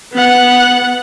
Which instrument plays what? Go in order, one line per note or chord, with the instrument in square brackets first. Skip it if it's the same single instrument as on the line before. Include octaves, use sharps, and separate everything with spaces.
[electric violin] B3 F#5